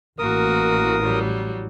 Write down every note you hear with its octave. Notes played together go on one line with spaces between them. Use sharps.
A1 A#3 F#4 A#4 D#6
F#3 G3